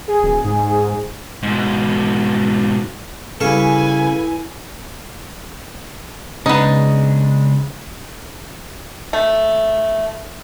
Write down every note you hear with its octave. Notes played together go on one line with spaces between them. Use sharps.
G#4
D1
G#2
G#2 B2
C#3 G3 E4 A4 B4 F5 G#5
C#3 G#3 B3 D4 D#4
A3